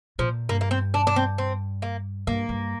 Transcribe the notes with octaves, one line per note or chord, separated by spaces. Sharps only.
A#2 F3
G2 A#3
A#3
C4
D4
D4
C4
C4
A#3
G2 A#3
G2